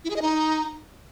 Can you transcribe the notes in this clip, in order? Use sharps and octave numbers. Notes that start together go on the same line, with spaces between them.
E4
G#4
D#5
D#4